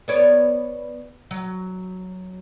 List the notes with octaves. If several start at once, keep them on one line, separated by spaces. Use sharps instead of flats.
B3 C#5 D5
F#3